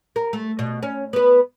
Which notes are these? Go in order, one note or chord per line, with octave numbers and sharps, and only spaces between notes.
A#4
A3
B2
C#4
B3 B4